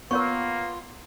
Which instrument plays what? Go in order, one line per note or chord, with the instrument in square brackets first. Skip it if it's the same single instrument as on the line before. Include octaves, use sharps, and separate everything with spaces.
[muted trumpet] A#3 [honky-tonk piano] B3 [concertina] F4 [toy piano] A#4 C#5 C#6